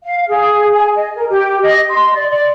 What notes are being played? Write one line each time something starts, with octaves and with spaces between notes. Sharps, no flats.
F5
G#4
G#5
D#5
A#4
G4
D#5
C6
D5
D5